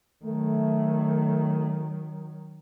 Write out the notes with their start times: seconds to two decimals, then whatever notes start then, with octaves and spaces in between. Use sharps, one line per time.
0.24 D#3 F#3 A3